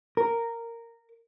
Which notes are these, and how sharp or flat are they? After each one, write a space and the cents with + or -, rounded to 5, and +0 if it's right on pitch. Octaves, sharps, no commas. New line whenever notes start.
A#4 -10